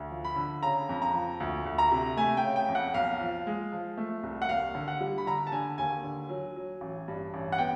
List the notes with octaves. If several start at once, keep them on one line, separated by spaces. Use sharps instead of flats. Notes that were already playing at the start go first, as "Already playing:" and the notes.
Already playing: D2
F3
B5
D3
C#3 A#5
F2
A#5
F3
D2
D2
A#5
C3
A3 G#5
G5
C#3
G5
F2
F#5
B1 F5
F3
G#3
F3
A3
C2
F#5
D#2 F5
D3
F#5
G3
B5
D3 A#5
A5
D3 G#5
D#2 G#5
D3
F#3
F#3
A1
G2
A1
F#5
B3 G5